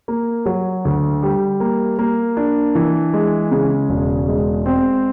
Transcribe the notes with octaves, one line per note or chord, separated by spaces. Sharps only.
A#3
F#3
D2
G3
A#3
A#3
D4
E3
G#3
C#3
E1
G#3
C4